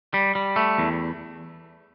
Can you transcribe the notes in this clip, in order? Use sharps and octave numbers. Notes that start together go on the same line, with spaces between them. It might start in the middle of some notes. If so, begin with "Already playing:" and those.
G3
G3
A3
E2